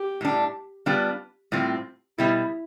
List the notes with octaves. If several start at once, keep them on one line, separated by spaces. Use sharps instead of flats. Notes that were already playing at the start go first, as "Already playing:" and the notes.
Already playing: G4
A2 G3 D4
G3 B3 D4 F4
A2 G3 C4 F4
B2 G3 B3 E4